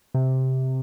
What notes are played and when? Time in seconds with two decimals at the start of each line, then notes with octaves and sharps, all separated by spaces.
0.14 C3